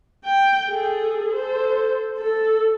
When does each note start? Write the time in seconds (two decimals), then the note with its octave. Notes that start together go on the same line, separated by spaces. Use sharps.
0.25 G5
0.69 G#4 A4
1.31 A4 C5
2.19 A4